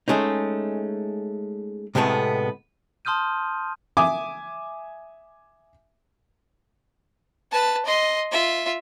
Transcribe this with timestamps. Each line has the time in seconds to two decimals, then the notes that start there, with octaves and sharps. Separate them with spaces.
0.08 G#3 A3 C#4 D#4
1.95 A2 C3 G#3 A3 B3
3.05 A5 C6 D#6 F6 G6 D#7
3.97 E5 G#5 D6 D#6
7.52 B4 A5
7.85 D#5 C6
8.32 F4 E5